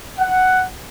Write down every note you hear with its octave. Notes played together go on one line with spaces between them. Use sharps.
F#5